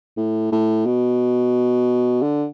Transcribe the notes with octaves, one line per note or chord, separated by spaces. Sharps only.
A2
A2
B2
D3